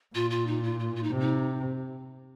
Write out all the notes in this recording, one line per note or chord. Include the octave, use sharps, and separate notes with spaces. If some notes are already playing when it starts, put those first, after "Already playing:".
A#2 F4
F4
D#4
F4
F4
F4
D#4
C3
D#4